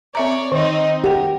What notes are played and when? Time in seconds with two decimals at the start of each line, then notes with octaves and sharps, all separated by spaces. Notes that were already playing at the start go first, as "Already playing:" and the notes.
0.15 C4 C#5 D5 E5 A#5
0.52 D#3 C4 D#4
1.04 G4 A#4 F#5 G5